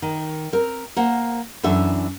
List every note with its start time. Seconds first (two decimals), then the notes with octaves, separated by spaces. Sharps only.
0.02 D#3
0.53 C4 A#4
0.96 A#3 C5 F#5
1.63 F#2 E3 D4 A4 E5